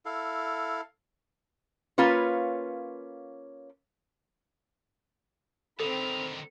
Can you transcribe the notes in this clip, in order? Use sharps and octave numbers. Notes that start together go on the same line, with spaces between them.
E4 A4 F5
A#3 C#4 F4 B4 C#5
D3 D#3 C4 A4 B5 F7